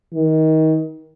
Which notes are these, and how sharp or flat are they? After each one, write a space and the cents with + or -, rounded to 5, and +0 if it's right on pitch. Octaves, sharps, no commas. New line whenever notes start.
D#3 +25